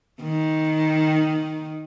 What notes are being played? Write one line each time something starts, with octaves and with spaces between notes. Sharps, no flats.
D#3